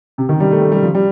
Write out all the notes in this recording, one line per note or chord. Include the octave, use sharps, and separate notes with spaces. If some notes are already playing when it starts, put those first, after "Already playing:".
C3
D#3
G3
A3
A3
G3
F3
G3